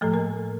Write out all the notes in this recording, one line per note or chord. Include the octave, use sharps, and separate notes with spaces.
A2 F3 A3 A4
A#3 A#4